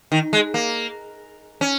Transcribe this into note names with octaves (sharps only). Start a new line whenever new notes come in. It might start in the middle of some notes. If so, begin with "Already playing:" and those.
D#3
G#3
A#3
C#4